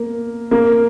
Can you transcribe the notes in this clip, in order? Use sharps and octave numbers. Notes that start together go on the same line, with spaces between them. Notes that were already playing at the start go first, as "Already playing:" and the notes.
Already playing: A#3
A#3